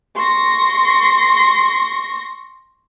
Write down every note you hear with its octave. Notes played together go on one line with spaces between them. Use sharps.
C6 C#6 A#6